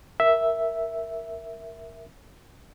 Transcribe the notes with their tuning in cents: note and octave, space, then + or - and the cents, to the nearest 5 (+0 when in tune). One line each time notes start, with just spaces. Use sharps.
A#4 +0 E5 +0